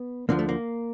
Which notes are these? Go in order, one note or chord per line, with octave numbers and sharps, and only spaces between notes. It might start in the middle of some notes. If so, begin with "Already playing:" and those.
Already playing: B3
D2 D3 F3 A#3
A3
A#3